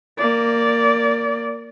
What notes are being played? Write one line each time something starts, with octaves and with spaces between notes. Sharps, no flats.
A#3 D5